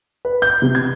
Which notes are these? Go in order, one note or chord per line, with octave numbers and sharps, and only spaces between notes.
B4
G6
C3
G#6